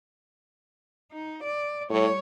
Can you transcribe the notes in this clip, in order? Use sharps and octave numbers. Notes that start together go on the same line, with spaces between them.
D#4
D5
A2 G3 C#5